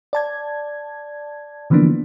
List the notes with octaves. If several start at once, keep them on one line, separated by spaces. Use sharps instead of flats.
D5 A5 G#6
D3 E3 F3 A#3 B3 D4